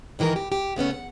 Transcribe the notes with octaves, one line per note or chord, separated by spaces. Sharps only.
G#2 D#3 E3 F#4 A#4
G4
G4
C#3 A3 B3 C#4
F#5